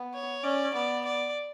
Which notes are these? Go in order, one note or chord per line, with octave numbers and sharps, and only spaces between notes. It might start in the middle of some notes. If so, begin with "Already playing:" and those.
Already playing: B3
C#5
C#4 D5
B3 D5
D5